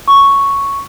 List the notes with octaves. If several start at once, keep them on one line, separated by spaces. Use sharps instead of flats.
C#6